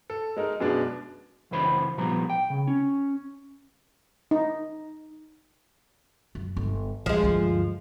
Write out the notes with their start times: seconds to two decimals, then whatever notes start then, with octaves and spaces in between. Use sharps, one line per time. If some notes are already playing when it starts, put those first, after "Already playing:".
0.10 A4
0.37 G#3 D#4 A#4
0.60 F#2 B2 G#3 B3 D4
1.51 C#2 F#2 E3 C5 B5
1.97 A#2 F3 G3 B3 A#5
2.30 G5
2.50 C#3
2.67 C#4
4.31 D#4
6.35 F#2
6.56 G1
7.06 C#2 F3 G#3
7.23 D2 G2